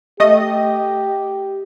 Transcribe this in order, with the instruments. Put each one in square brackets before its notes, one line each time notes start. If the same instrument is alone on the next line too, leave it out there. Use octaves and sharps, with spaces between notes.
[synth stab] A3 D#5 [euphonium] G4